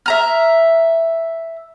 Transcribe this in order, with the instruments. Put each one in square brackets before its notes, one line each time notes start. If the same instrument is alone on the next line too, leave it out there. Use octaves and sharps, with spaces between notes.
[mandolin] E5 A#5 F6